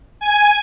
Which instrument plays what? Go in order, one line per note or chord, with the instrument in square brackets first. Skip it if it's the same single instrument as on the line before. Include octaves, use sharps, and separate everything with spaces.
[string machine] G#5